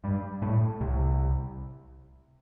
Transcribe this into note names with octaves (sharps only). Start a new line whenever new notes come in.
G2 G3
A2 A3
C2 C3